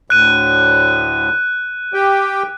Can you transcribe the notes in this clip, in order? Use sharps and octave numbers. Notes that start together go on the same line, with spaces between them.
D2 A2 F#6 D#7
G4 G5